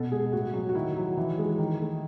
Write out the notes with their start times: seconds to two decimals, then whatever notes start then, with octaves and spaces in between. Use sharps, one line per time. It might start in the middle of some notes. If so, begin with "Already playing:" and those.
Already playing: B2 A4
0.11 G#3 G#4
0.33 A2 F#4
0.54 F#3
0.69 F#4
0.75 D#3 E4
0.96 F#3
1.17 E3
1.38 G#3
1.58 D#3
1.80 A3